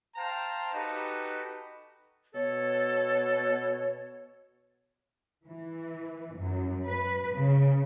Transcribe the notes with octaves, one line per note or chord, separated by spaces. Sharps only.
C5 F5 G5 A5 A#5
D#4 F#4 G4 A4 B4
B2 A4 C#5
E3
F#2
B4
C#3